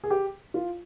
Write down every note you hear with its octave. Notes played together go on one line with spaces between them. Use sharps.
G#4
G4
F4